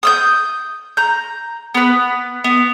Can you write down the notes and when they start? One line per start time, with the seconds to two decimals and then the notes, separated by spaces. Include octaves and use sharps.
0.03 D#6 E6 G6
0.97 A#5 G6
1.75 B3 B4
2.44 B3